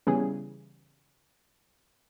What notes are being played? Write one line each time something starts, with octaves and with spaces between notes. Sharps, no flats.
C#3 E3 G3 B3 G#4